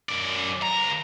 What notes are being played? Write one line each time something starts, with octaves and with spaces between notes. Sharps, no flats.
F#2 D5
C#2 A#5